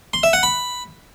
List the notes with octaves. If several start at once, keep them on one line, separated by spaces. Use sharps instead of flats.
C6
E5
F#5
B5